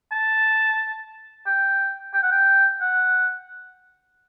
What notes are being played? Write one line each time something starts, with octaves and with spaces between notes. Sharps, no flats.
A5
G5
G5
F#5
G5
F#5